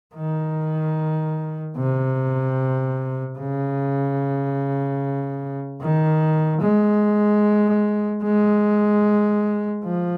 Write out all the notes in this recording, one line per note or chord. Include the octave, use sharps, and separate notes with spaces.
D#3
C3
C#3
D#3
G#3
G#3
F3